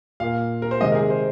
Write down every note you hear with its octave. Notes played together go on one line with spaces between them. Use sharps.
A#2 A#3 F5
A#4
C5
C3 D#3 G#3 C4 D#5
A#4
G#4
C5